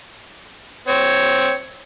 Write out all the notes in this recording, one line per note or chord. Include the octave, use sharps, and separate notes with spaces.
C4 C#5